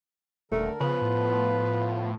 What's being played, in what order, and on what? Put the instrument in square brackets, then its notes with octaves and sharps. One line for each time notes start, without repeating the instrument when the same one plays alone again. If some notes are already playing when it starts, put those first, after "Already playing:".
[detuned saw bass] D#1 [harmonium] D3 A4 A#4 [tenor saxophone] A3
[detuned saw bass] C#3 [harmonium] F3 B3 F4 [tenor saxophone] B4
[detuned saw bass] A2